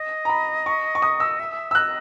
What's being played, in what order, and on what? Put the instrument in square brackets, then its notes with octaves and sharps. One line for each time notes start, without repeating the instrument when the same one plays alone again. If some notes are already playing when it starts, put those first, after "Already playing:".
Already playing: [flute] D#5
[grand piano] A#5
B5
C#6
C#6
D#6
E6
[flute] E5
[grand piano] E6
[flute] D#5 [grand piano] F#6